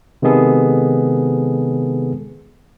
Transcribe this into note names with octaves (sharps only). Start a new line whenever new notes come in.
C3 D#3 G#3 B3 G#4 A4